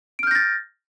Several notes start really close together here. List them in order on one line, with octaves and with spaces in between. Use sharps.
D7 F6 G6 A#6 A6